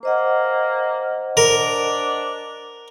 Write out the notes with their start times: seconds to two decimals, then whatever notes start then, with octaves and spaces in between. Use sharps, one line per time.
0.03 A#3 C5 D#5 F#5
1.37 D4 A#4